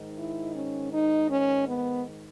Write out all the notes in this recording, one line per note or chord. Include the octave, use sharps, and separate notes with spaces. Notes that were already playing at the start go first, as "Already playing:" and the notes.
Already playing: G#2 D#3
E4
C#4
D#4
C#4
B3